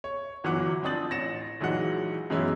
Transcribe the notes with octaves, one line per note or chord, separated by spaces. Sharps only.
C#5
G1 E3 F#3 F#5 D6
F3 C4 D4 D#6 A6 F#7
A1 A#6 C#7 E7
A#1 E3 F#3 G#3 D#4 F#5
F#2 B2 E3 G#3 C#4 E4